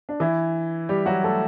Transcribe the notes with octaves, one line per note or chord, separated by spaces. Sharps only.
D4
E3 E4
G3 G4
F#3 F#4
A3 A4